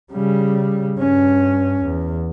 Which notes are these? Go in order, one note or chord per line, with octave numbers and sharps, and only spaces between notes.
C#3 G3
G2 C#4
E2